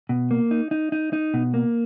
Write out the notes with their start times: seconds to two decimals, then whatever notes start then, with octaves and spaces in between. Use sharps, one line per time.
0.09 B2
0.31 A#3
0.51 D#4
0.71 D#4
0.92 D#4
1.13 D#4
1.34 B2
1.54 A#3